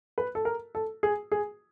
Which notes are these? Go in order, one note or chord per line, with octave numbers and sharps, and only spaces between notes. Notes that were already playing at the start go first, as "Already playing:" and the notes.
B4
A4
A#4
A4
G#4
G#4